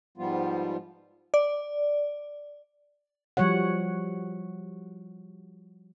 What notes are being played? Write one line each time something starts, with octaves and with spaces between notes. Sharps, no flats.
G#2 F3 G3 B3 F4
D5
F3 G3 F#4 C#5 F#5